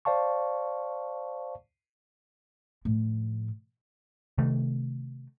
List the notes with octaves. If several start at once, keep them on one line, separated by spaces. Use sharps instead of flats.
C5 D5 F5 A5 C#6
A2 F3
C3 D#3 A3